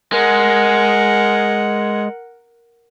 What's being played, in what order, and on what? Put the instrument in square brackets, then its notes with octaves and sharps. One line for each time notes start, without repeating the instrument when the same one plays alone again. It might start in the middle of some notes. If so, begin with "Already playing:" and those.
[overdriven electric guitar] G#3 [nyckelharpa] A#4 F#5